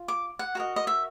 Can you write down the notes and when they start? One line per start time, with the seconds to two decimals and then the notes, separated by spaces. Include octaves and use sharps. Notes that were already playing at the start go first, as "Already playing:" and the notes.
Already playing: F4
0.08 D6
0.39 F#5
0.55 F#4 A#4 D#5
0.76 D#5
0.87 E5